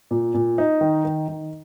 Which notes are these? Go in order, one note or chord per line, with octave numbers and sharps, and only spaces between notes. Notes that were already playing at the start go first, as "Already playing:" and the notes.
A#2
A#2
D#4
D#3
D#3
D#3